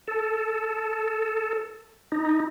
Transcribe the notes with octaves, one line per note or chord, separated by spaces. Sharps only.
A4
D#4